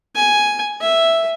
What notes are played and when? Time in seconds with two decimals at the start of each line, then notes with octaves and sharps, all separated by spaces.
0.15 G#5
0.81 E5